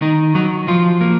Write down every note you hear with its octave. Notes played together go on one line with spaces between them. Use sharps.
D#3 D#4
F#3 D#4
F3 F4
A#3